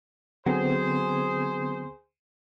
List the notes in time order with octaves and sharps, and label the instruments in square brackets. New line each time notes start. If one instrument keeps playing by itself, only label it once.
[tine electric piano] D3 B3 C4 [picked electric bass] F#3 [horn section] G#4 C5